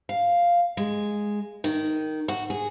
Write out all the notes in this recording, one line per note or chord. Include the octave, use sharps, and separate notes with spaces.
F5
G#3
D#3
F#4
G#4